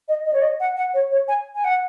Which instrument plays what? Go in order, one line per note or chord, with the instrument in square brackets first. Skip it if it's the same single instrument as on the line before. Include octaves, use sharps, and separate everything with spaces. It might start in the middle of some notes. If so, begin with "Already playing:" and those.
[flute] D#5
D#5
C#5
D#5
F#5
F#5
C#5
C#5
G#5
G#5
F#5